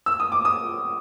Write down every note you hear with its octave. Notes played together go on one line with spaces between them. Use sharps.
E6
D#6
D6
D#6